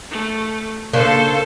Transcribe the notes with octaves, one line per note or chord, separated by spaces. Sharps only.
A3
C#3 A#3 D4 A4 C5